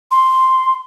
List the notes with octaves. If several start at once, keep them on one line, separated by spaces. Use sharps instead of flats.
C6